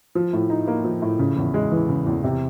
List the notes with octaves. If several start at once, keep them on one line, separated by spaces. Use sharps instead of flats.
F3
A2
D#4
A#3
F3
A2
C#3
E2
G#3
E3
C#3
E2
C3